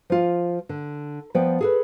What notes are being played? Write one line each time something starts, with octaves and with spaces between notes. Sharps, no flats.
F3 F4
D3
F3 B3 D5 G5
G#4 A4 B4